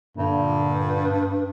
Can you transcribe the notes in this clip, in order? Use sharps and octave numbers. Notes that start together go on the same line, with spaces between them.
G2 A#2 D3